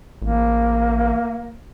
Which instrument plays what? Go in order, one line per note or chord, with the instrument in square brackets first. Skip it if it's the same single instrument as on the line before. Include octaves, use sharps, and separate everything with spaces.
[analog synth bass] A1 [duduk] A#3